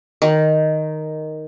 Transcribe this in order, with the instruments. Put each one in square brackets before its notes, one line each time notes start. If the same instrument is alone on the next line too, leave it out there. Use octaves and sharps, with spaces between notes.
[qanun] D#3